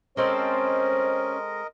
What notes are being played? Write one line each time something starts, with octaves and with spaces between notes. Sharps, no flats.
G#3 C4 C#4 A4 A#4 C5 D#5